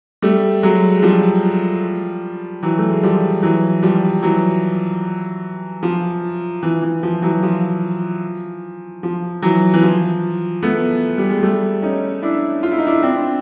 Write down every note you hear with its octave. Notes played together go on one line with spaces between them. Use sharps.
G3 A3
F#3 G#3
G#3
F3 G3
E3 F#3
A3
G#3
F3 G3
E3 F#3
F3 G3
E3 F#3
F3
E3
E3
F3
E3 F#3
F3
F3
E3 F#3
E3
F3
A3 B3
G3
G#3
G3 A3
C#4 D#4
D4 E4
F4
E4
D#4
D4 E4
C4 D4